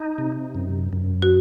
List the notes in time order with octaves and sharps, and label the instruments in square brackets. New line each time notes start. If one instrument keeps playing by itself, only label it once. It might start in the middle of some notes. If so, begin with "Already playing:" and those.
Already playing: [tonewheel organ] D#4
C3
F#2
F#2
[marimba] F#4